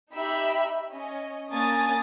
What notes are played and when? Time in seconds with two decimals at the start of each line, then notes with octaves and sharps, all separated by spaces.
0.12 D#4 G4 E5 B5
0.92 C#4 D#5
1.52 A#3 C#4 D4 G#5 D#6 A6